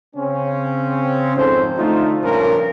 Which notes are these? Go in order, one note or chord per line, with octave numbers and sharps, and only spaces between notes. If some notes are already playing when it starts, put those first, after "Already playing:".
C#3 C4 C#4
G#1 F2 G#2 A4 C5
D3 A3 D#4 F4
C#2 G2 A#2 F3 C#4 A#4